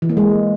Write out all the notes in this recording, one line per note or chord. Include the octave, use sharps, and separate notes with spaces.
E3
A#3
G#3